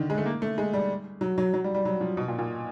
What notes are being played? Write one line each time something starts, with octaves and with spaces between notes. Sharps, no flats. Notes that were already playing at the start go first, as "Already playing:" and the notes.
Already playing: D3 D#3
G#3
A3
A#3
A3
G#3
G3
F#3
F#3
F#3
G3
G3
F#3
F3
B2
A#2
A#2